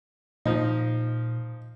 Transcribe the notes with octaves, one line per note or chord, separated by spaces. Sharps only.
A#2 F3 D#4